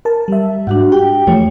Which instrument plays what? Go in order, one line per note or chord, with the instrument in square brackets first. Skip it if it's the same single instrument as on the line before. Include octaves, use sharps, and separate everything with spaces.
[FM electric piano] A#4 A5
G3 E5
[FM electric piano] G#2 [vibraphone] D4 F#4 F#5
[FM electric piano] G4 [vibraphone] G5
[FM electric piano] E2 F3 A3 [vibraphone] C#5